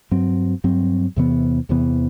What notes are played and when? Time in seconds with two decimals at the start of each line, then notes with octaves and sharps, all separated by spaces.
0.11 G2 F#3 C4
0.64 G2 F#3 C4
1.16 E2 C3 E3 B3
1.69 E2 C3 E3 B3